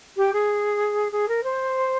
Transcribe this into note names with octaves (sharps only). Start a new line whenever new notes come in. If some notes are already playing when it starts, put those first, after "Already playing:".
G4
G#4
G#4
A#4
C5